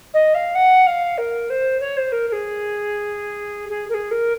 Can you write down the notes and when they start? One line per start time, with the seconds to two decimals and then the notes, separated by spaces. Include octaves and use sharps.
0.13 D#5
0.34 F5
0.55 F#5
0.86 F5
1.17 A#4
1.50 C5
1.80 C#5
1.97 C5
2.12 A#4
2.27 A#4
2.32 G#4
3.69 G#4
3.89 A#4
3.94 G#4
4.11 A#4